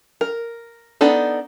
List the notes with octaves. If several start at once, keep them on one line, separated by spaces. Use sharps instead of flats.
A#4
B3 D4 D#4 A4